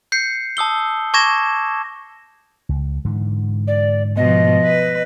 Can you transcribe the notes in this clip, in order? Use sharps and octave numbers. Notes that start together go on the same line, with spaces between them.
G6 C7 C#7
A5 D#6 E6 G7
A5 C#6 D6 G#6 A#6 E7
C#2
G#2 D3 E3
D5
B2 F3 D#5
B4